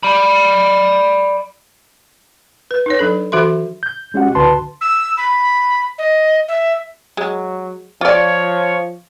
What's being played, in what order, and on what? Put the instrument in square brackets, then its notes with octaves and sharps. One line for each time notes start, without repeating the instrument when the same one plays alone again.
[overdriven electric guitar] D5 B5
[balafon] B4
D#4 B4 C#5
F#3 D4 A4
E3 F#4 A4 E5 C6
[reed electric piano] G6
G#3 C#4 F#4 G4 F#5
C#2 D3 F#4 B4 A5 C6
[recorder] E6
B5
D#5
E5
[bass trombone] F#3 [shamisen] G#3
[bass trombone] F3 [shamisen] F4 D5 [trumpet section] C#5